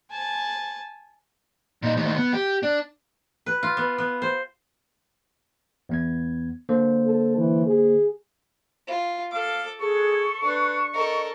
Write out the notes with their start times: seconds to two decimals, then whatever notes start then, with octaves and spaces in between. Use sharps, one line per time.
0.11 G#5 A5
1.82 A#2 D#4
1.97 D2 D#3
2.17 B3
2.33 G4
2.63 D4
3.46 B4
3.63 F4
3.77 B3
3.98 B3
4.22 C5
5.89 E2 B3 G#6
6.69 D3 A#3 C5
7.06 A4
7.37 E3
7.66 G#4
8.87 F4
9.32 A4 F5 D6
9.80 G#4 A4 C#6
10.44 D4 B4
10.94 A4 A#4 D#5